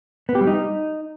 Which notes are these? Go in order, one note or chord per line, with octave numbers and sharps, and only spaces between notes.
B3
G4
G3
D#4